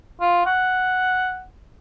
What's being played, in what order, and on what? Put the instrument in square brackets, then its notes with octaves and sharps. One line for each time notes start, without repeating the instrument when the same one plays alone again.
[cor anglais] F4
F#5